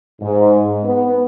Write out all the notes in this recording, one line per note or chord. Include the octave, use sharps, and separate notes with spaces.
G#2
B3